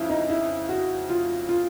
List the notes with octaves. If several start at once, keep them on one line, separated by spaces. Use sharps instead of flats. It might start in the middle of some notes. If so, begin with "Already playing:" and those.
Already playing: F2 C#3 E4 F4
D#4
E4
F#4
F4
F4